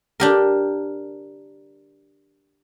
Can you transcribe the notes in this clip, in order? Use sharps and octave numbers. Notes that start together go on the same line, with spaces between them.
D4 G4 A#4